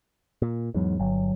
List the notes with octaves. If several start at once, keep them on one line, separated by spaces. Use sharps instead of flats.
A#2
E2 G#2 F#3
G1 F#3